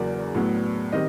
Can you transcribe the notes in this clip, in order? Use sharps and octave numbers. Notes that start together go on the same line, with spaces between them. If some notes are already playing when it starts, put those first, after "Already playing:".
Already playing: E2 C#3 F#3 A#3 D5
A2 F#3 B3
D#3 G3 C4 D#5